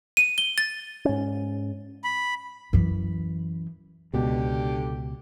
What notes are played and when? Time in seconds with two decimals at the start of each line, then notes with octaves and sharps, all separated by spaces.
0.17 D#7
0.38 G7
0.58 A6
1.05 G#2 C#4
2.04 B5
2.73 F#2 E3
4.13 C#2 B2 D3 G4